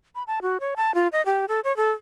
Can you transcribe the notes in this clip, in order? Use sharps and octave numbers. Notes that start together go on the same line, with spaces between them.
B5
A5
F#4
C#5
A5
F4
D#5
G4
A4
C#5
A4